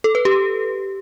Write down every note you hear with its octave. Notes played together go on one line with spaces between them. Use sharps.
A4
B4
G4